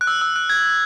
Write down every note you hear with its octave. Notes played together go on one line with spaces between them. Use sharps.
F#6
E6
E6
F#6
G#6